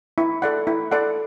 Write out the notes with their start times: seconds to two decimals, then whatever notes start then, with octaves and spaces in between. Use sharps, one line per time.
0.18 E4
0.42 A4 D5 F#5
0.67 E4
0.91 A4 D5 F#5